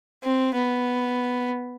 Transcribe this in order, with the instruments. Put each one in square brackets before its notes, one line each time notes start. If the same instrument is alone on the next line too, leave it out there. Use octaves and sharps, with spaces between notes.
[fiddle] C4
B3